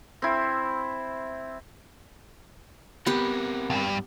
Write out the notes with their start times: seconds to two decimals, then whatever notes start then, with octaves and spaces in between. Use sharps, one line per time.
0.22 C4 E4
3.06 B3 C4 G4 A#4 F#5
3.70 C#2 G2